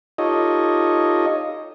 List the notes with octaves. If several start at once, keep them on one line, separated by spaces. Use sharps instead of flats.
D#4 F4 G4 A4 C#5 D#5